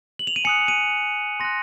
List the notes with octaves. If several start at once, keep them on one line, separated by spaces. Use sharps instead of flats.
F#7
F7
D#7
G#5 D#6 F#6 C#7
D#7
C6 F#6 A#6